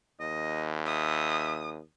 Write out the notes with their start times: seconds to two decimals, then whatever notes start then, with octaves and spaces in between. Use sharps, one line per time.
0.20 D#2 D#5
0.86 E5 D#6